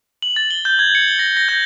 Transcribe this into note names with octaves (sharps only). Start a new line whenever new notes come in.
F#7
A6
G7
G6
G#6
C#7
G7
A#6
A#6
G6